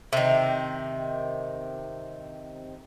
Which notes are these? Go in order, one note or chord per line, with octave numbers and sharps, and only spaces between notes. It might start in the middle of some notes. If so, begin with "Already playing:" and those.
C3 D#3